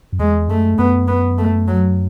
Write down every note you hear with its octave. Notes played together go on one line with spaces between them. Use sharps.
F#2
E2 G#3
F#2 A3
F#2 B3
B3
A3
F#3